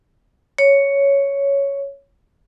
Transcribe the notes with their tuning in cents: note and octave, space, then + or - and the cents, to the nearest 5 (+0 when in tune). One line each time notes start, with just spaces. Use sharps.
C#5 +5